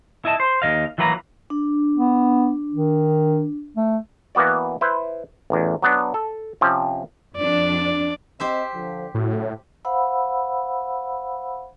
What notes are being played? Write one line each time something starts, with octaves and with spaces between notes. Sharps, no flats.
E4 D#5 A5
C5
D#2 E3 D#5 F5
E3 F#3 A#3 B4 G5 A#5
D4
B3
D#3
A3
E3 A#3 B3 F#4 D5
E4 B4 C5
A1 E2
F#3 B3 D4
A4
C3 F3 C4 C#4
F2 D4 D5
C4 G4 C5 D#5 E5
D3 F3
A2 C#3 F#3 F#4
C5 F5 F#5 B5 E6